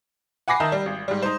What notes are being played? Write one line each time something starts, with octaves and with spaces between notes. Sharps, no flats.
F#5 G#5 B5 D6 A#6 C7
D#3 D#5 E5 A5 A#5 G6
G3
G#1
G#2 G3
D#4 C5